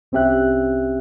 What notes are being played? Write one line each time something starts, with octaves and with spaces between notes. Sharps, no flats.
C2 C4 C#4 G4 E5 F#6